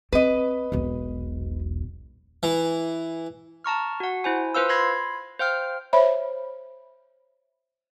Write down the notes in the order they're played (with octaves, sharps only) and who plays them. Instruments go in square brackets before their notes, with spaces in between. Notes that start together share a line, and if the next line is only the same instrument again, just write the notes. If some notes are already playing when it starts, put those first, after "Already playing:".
[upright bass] C4 [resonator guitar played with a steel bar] B4 D#5
[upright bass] E1 B1
[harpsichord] E3
[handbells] A5 A#5 C#6 F6
F#4 F#5
E4 C5 G#5
F4 B4 C5 F5 E6
B5 C6 G#6 A#6 C7
C5 F5 G5 F6
[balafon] C5 C#5 E5 B5